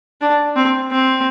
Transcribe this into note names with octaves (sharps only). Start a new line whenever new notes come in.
D4
C4
C4